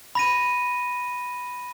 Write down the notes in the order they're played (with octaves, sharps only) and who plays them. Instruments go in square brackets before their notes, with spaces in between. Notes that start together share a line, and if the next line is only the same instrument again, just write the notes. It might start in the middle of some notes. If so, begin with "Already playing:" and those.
[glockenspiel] B5 A#6 D#7